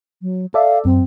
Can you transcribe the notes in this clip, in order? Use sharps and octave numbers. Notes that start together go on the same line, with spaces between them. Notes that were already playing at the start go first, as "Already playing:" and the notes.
F#3
A4 D5 E5 F5
F#2 C4